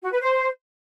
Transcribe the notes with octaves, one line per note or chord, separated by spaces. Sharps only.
F#4
B4
C5